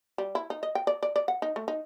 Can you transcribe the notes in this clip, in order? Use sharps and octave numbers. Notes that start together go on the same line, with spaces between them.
G3
E4
D#4
D#5
G5
D5
D5
D5
F#5
D#4
A3
D#4